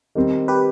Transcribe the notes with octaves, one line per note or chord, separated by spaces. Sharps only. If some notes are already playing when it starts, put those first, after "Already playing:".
D#3 G3 C4
G4 B4